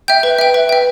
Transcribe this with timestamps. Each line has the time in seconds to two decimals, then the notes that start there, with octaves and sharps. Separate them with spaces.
0.08 E5 G5 G6
0.23 B4
0.39 E5 G5
0.54 B4
0.69 E5 G5